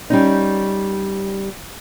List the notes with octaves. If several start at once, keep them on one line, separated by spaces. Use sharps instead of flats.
G3 C#4 D#4